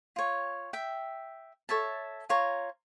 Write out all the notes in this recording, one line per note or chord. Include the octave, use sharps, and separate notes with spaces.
F4 C#5
E5 G5
A4 C#5 E5 A5
F4 C#5 A#5